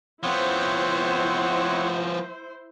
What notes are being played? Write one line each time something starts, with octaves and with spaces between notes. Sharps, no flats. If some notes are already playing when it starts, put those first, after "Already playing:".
F3 B3 C4 E4 C5 C#5 F#5